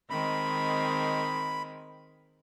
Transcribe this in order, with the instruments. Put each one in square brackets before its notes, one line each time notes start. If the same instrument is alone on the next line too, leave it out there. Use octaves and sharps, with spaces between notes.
[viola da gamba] D#3 G#3 C4 [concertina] B5